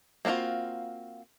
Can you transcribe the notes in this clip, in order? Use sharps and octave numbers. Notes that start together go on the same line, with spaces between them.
A#3 C4 D4 F4 F#4